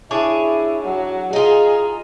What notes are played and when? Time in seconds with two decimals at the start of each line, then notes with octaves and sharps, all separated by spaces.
0.11 D4 E4 G#4 C#5
0.83 F#3
1.33 D#4 F4 G#4